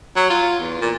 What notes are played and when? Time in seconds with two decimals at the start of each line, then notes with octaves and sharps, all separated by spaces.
0.16 F#3
0.30 F4
0.60 E2
0.81 A#2